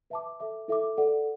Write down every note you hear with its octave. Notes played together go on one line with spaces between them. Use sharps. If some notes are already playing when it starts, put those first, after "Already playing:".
B4 E5 A5 D6
A4 E5 D6
E4 A4 E5 D6
A4 D5 F#5